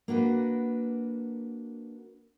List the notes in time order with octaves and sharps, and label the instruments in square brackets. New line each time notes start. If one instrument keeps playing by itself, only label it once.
[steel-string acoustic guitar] A#3 D4 F#4 B4